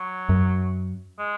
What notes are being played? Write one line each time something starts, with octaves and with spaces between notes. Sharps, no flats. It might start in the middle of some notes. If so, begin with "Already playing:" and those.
Already playing: F#3
F#2
G#3